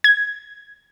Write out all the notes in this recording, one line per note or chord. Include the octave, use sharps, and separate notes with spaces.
G#6